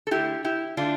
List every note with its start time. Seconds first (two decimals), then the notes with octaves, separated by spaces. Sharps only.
0.07 A4
0.11 D3 A3 E4 G4
0.44 E4 G4
0.77 D3 A3 D4 F4